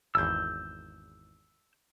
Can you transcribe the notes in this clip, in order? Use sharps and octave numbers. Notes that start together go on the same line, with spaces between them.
G#1 E2 E6 G6